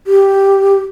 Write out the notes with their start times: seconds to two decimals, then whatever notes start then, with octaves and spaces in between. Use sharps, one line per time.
0.07 G4